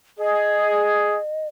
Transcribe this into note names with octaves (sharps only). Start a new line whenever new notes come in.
G#4 D#5